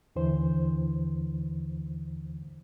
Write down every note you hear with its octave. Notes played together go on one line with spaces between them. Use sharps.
D#2 D3 E3 C5